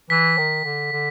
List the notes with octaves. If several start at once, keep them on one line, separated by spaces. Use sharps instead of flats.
E3 B6
D#3
D3
D3